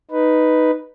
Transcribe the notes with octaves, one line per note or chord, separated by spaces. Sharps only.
D#4 B4